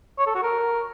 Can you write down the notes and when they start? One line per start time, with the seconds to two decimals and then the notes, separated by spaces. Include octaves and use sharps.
0.19 C#5
0.27 A4
0.35 F#4
0.43 A#4